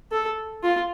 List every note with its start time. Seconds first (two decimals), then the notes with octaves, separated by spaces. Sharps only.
0.12 A4
0.63 F4